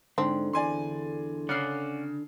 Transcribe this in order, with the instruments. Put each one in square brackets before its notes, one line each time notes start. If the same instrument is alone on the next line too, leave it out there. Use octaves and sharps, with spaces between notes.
[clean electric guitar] G#2 [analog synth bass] D3 [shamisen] C4
[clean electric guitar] E2 [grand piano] D5 G#5 C6
[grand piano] C#3 F6 C7 [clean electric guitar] C#4 D5 F#5